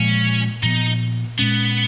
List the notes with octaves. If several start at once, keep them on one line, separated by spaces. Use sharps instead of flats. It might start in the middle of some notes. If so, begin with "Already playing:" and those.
Already playing: A#2 F3 G#3 C#4
A#2 F3 B3 D#4
A#2 G#3 B3 C#4